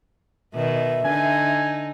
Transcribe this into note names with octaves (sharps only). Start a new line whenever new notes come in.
B2 D#3 E5
D3 D#4 G#5